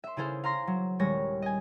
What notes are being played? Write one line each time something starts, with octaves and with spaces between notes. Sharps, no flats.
E5 C6
C#3 E4 G#4 A4 C5 F5
F5 A#5 C6 A#6
F#3
D#1 G3 G#3 C#5 A#6
D#5 G#5